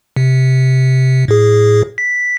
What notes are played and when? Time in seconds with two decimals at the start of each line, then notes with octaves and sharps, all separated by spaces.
0.16 C3
1.28 A2 G#4
1.98 B6